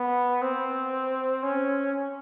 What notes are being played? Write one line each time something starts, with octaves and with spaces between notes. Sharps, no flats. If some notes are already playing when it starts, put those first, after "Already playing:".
Already playing: B3
C4
C#4